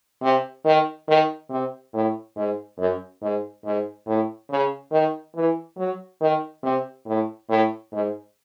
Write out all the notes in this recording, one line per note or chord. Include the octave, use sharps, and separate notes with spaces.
C3
D#3
D#3
C3
A2
G#2
F#2
G#2
G#2
A2
C#3
D#3
E3
F#3
D#3
C3
A2
A2
G#2